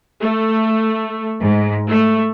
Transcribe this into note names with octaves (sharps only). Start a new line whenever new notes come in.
A3
G#2
A3